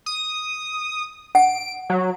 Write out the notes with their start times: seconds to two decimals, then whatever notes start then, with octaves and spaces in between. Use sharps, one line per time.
0.06 D#6
1.35 F#5 D7
1.90 F#3